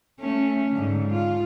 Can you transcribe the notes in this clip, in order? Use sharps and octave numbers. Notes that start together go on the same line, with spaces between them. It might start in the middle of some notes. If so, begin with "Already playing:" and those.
A3 C#4
G#2 D3
F4